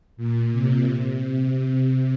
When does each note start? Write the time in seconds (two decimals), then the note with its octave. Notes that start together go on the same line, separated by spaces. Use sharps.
0.17 A#2
0.52 C3
0.88 C3
1.24 C3